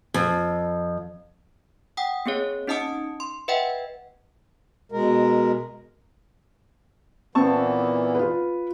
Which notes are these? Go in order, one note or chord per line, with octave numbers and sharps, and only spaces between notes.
F2
F#5 G5 D#6
A#3 C4 G#4 C#5
C#4 D#4 D#5 A5 D#6 C#7
C6
B4 D#5 E5 F#5 G5
B2 G#3 A#4
A#2 E3 B3 C4 A5 C#6
F4 B4